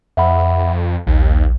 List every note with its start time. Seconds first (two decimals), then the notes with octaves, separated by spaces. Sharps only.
0.17 F2 E5 F#5 B5
1.07 A#1 D#2